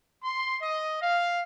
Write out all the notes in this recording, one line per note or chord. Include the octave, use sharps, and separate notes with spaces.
C6
D#5
F5